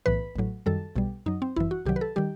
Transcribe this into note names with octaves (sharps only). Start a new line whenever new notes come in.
B1 A2 E3 B4
A1 A2 F#3
F#2 D#3 G3 A4
B1 B2 G3
F#2 F#3 D#4
C4
G1 F#2 E3 E4
F#4
C2 C3 D#3 F#3 G4
B4
A4
D#3 G3 G4